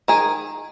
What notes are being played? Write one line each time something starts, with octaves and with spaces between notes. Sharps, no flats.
D#3 G#4